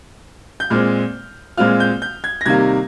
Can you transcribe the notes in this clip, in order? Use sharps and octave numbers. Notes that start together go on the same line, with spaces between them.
G6
A#2 G#3 C4 F6
A#2 G#3 C4 F4 F6
G6
G6
G#6
A#6
C3 D#3 G3 A#3 G#6